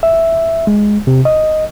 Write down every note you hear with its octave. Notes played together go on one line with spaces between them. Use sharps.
E5
G#3
C3
D#5